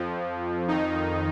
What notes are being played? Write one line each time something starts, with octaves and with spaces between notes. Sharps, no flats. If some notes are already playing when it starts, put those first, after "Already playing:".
Already playing: F2 F3
F2 D#3 D#4